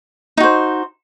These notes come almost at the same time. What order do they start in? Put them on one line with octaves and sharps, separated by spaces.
D#4 F#4 C5